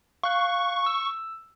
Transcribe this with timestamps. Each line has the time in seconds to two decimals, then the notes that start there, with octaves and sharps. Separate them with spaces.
0.23 F5 C#6 F#6
0.86 E6